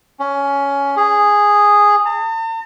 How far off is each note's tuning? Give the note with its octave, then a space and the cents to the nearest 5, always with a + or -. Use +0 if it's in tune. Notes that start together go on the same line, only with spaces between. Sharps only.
C#4 +15
G#4 -10
A5 +45